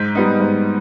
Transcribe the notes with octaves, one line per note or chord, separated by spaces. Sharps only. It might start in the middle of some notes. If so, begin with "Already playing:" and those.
Already playing: G#2 G6 B6
G3 B3 D#4
G#2